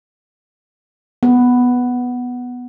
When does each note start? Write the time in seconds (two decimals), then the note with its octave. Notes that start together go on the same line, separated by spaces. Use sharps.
1.23 B3